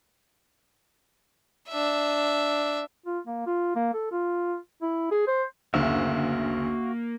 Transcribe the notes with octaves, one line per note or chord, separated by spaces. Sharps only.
D4 E5
F4
A#3
F4
A#3
A4
F4
E4
G#4
C5
F#1 D2 A#3 F#4 E5 F5